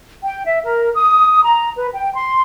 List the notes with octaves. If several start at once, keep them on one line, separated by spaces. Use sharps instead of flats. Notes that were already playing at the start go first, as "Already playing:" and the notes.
G5
E5
A#4
D#6
A#5
B4
G5
C6